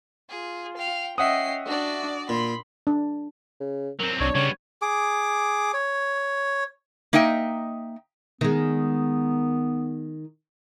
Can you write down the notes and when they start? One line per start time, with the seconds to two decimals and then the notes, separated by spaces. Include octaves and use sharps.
0.30 F4 G#4
0.77 F5 G5
1.18 C#4 D#5 E5 F#5 G5 D#6 C7
1.66 D4 F#4 D5
2.29 A#2 B5 C6
2.87 D4
3.60 C#3
3.99 F#3 C4 A#4
4.21 C2 D4 C#5
4.35 C#3 G3 B3 C#5
4.82 G#4 D6
5.74 C#5
7.13 A#3 D#4 D#5 E5 G5
8.41 D#3 G#3 B3